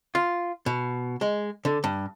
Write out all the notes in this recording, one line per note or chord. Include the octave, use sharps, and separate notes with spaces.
F4
B2
G#3
D3
G2